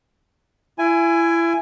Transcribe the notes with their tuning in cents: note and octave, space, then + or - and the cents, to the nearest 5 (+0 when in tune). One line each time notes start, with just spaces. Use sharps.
E4 +30 G#5 +0